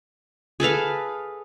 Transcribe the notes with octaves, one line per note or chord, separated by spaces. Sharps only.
G#4 A4 B4 F5